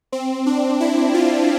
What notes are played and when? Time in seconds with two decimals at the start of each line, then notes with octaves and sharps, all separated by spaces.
0.12 C4
0.46 D4
0.80 E4
1.14 F4